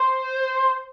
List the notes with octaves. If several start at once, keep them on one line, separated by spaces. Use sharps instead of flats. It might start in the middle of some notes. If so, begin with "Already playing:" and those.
Already playing: C5